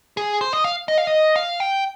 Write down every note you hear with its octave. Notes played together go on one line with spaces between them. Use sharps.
G#4
C5
D#5
F5
D#5
F5
D#5
F5
G5